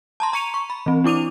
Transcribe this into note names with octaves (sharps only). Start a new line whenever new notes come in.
A5 A#5 C6
A#5 C#6 C#7 D#7 F7
C#6
B5
E3 C4
D4 E4 D6 D#7 F7